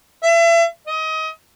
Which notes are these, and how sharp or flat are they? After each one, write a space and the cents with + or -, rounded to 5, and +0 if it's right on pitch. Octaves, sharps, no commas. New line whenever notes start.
E5 +35
D#5 +25